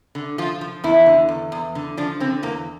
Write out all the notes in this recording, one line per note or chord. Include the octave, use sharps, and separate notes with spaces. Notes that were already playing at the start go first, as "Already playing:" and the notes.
D3
F3 F4
F3
E2 E4
D3
E2
E2
D3
F3 D4
D3 C4
E2 A#3